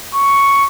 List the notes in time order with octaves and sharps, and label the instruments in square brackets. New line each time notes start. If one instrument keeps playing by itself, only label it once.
[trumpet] C#6